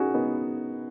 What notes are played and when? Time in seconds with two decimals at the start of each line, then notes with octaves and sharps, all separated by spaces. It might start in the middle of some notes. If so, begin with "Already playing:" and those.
Already playing: C#4 D#4 F#4 G#4
0.14 B3 D#4